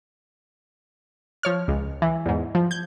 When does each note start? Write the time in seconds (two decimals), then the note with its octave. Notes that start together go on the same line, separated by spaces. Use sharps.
1.43 F3 C#5 F6
1.68 C#2
2.02 E3
2.26 E2 G#2
2.55 F3
2.71 G6 G#6